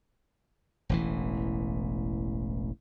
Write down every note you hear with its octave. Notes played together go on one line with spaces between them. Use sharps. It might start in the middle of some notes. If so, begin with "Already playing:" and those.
E1 A1 E3